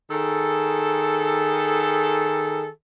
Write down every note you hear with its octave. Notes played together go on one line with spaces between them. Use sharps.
D#3 G#4 A4